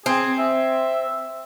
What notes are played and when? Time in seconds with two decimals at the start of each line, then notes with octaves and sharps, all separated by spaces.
0.06 C4 G#4
0.39 E5